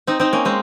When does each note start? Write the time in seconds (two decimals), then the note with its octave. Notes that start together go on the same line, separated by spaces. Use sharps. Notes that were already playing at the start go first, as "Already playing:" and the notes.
0.07 C4 D#4
0.20 C4 D#4
0.33 A#3 C#4
0.45 G#3 C4